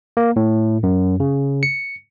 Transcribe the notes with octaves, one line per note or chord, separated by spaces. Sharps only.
A#3
A2
F#2
C#3
C#7